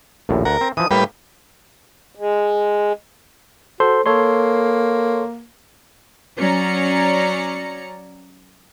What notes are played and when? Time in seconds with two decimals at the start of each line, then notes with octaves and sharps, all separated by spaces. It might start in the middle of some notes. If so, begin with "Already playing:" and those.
0.29 A#1 D#2 A2
0.45 D2 A#4 F#5
0.61 C4
0.77 E3 F3 D#6
0.91 A2 G3 A#3 B4
2.15 G#3
3.80 F#4 A4 C5 C6
4.06 A#3 A4 C#5 C6
6.38 F#3 C#4 D5 A#5 C#7